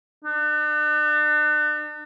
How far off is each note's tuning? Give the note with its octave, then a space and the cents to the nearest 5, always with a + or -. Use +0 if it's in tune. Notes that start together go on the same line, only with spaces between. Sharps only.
D4 +40